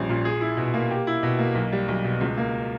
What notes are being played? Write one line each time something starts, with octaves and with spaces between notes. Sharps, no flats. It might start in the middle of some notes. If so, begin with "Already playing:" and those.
Already playing: A#1 G3 C#4
A#2
G#4
E4
B2
A#3
G4
E4
B2
A#3
B1
G3
B1
B2
C#2
A#3